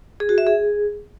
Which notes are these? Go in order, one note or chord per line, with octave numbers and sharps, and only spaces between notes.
G#4
F#4
E5
G#4